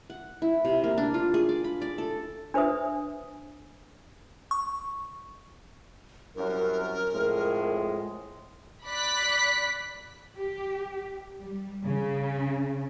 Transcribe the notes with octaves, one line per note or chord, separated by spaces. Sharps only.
F#5
E4
C3
A#3
D4
F4
G#4
D5
B5
D5
A4
D4 B4 C5 E5 D#6
C#6
C2 F#2 A#4
F2 A2 G#3
D5 B5 F#6 B6
G4
G3
C#3